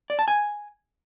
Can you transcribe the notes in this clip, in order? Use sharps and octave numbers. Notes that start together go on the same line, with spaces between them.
D5
A5
G#5